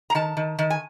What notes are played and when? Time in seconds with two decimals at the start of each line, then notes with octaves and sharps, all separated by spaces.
0.10 A#5
0.15 D#3 A5
0.37 D#3
0.59 D#3
0.70 G#5